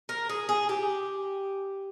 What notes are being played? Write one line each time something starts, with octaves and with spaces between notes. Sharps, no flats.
A#4
G#4
G#4
G4